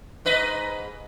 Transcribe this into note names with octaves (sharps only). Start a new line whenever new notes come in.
G#2 B4 D#5